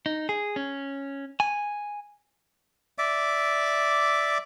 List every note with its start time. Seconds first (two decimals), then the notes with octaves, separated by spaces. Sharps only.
0.06 D#4
0.29 G#4
0.56 C#4
1.40 G#5
2.98 D5 E5 D6